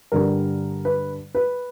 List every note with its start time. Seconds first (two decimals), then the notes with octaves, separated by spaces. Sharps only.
0.12 G2 D3 G3 A#4
0.85 B4
1.35 B4